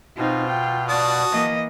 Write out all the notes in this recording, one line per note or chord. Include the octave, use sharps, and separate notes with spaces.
B2 C4 D#4 F4
G5
F#4 D5 A5 D#6
E3 A#3 D#5